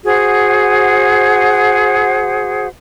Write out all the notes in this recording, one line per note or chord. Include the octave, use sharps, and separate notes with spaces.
F#4 G#4 C5 F#5